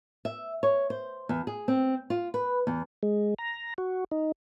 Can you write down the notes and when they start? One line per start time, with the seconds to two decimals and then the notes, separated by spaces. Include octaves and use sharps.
0.25 E5
0.63 C#5
0.90 C5
1.29 E2
1.47 G#4
1.68 C4
2.10 F4
2.34 B4
2.67 E2
3.03 G#3
3.39 A#5
3.78 F#4
4.11 D#4